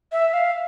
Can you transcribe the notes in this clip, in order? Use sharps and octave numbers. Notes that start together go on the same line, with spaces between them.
E5
F5